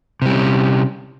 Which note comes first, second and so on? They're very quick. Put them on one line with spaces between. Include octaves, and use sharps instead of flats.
C3 G3 C#4